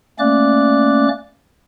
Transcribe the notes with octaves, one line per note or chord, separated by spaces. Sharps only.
A3 A#3 C#4 D5 D6 F#6